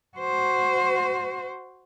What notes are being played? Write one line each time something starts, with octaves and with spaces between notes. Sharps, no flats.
F#4 C5